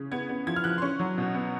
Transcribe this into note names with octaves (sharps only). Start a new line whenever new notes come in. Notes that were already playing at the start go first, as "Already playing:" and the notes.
Already playing: C#3
B3 G#6
B3
F3 G#6
F6
F3 F#6
C6
C#4 C#6
F#3
B2
B3